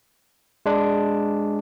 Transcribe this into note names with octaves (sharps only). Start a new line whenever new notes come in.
G#3 D4